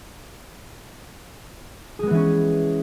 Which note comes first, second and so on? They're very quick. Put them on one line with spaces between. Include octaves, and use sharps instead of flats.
G#4 G#3 B3 E3 C#4